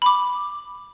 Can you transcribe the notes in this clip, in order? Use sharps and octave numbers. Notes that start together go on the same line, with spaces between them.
B5 D6